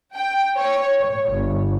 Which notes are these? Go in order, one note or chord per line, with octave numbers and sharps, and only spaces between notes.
G5
C#5
C#5
G1